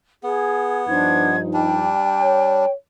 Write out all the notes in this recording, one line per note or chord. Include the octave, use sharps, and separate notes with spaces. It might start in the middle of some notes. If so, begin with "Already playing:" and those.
B3 G#4
G2 F3 D4 D#4 C5 G#6
G3 D4 G5
C#5